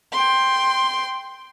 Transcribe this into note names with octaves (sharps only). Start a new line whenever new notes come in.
G5 C6